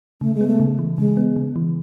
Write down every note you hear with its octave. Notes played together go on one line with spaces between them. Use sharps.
C#3 A3
G#3
B3
A3
C#3
E3
C#3 G#3
B3
C#3
E3